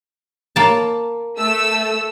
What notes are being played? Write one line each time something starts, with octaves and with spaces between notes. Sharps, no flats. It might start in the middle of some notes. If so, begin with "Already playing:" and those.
A#3 A5
A3 E6